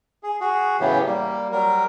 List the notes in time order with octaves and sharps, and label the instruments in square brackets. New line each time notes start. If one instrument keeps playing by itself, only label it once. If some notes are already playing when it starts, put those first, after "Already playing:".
[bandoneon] G#4
F#4 G#4
A2 C#3 E3 F#3 B3 G4
G3 A#3
F#3 G3 A#4